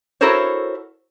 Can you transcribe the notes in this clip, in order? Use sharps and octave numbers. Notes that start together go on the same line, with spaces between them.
E4 F#4 A4 A#4 C5 C#5